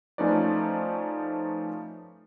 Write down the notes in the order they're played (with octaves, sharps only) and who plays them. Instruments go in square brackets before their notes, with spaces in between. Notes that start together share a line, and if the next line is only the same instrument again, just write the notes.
[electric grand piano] F3 A3 C#4 D#4 B4 D5